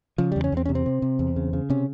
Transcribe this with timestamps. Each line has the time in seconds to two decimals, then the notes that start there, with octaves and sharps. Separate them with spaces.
0.18 C#3 F3
0.32 E2 G3
0.44 C#4
0.52 E2 C4
0.66 C3 C#4
0.75 C4
0.86 C3
1.02 C3
1.19 E2
1.36 C#3
1.53 C#3
1.70 C3 C#4